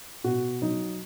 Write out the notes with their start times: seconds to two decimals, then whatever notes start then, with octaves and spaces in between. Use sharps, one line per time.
0.24 B2 F#4
0.62 F#3 D#4